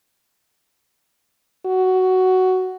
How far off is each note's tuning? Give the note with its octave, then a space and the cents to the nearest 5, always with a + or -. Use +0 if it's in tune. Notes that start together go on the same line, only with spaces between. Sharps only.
F#4 +10